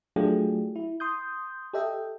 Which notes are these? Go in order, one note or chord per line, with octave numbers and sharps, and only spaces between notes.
F#3 A3 D4 F4 G4 G#4
E4
C6 D#6 G6
G4 A4 D#5 E5 G5